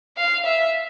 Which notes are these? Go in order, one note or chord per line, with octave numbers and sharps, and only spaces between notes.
F5
E5